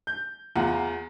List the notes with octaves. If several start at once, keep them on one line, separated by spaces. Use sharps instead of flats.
G6
E2 F4 F#5 A#5